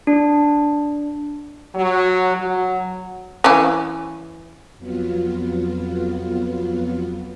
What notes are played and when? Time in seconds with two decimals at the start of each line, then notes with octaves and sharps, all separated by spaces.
0.07 D4
1.75 F#3
2.35 F#3
3.44 E3 C#4
4.77 F2 F#3 B3 F4